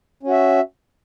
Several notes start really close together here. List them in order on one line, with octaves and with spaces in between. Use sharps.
C#4 F#4 E5